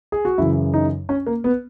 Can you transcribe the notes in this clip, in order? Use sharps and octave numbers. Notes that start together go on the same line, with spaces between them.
G#4
F#4
F#2 C#3 E3 E4
D#4
C#4
A#3
B3